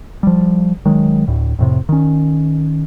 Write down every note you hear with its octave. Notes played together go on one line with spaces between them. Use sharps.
F3 G3
D#3 F#3 G#3
D2 A2
F2 A2 C3
D#3 C#4